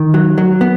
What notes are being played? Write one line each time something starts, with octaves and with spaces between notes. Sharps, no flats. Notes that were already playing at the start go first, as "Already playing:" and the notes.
Already playing: D#3
F#3
F#3
B3